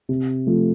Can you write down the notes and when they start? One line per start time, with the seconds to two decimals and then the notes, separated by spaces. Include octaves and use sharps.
0.09 C3
0.47 F3 A3